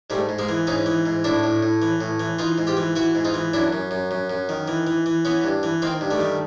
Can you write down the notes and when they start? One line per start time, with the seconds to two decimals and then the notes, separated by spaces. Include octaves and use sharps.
0.10 G#2 G3 A3
0.29 G#2
0.39 G#3 A#3
0.49 E3
0.67 G#2 C#4 D#4
0.86 E3
1.06 G#2
1.24 A2 D4 E4
1.43 A2
1.63 A2
1.82 E3
2.01 A2
2.20 E3
2.38 E3 D#4 F4
2.58 G#2
2.67 F4 G4
2.77 E3
2.96 E3 E4 F#4
3.15 G#2
3.25 D#4 F4
3.34 E3
3.53 F#2 D4 E4
3.73 F#2
3.91 F#2
4.11 F#2
4.30 F#2
4.49 D#3
4.68 E3
4.87 E3
5.06 E3
5.25 E3 B3 C#4
5.44 G2
5.63 E3
5.82 D#3 A#3 C4
6.01 G2
6.11 G3 A3
6.20 D#3